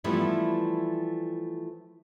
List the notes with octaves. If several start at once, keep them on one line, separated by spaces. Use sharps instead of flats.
E3 F3 G3 A3 B3 E4